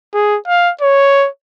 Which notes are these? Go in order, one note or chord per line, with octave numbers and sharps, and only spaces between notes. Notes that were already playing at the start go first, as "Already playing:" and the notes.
G#4
F5
C#5